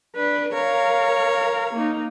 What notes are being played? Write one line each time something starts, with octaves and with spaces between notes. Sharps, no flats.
D4 B4
A#4 C#5 F5
A#3 D#4